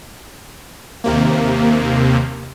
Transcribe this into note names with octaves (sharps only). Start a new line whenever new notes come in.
D#2 C3 A#3